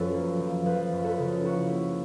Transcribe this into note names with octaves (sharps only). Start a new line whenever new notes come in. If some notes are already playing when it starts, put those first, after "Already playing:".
Already playing: F#2 F3 A4 B4
A#3
F3
F3 A4 B4
F#2
A4 B4
C#3
A#3 E4 F#4
A#3